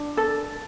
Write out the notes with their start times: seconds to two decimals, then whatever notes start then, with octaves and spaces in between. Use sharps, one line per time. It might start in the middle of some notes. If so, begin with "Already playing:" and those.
Already playing: D4
0.17 A4